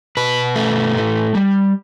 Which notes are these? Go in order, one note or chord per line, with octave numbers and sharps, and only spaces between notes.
B2 B4
A3
A2
G3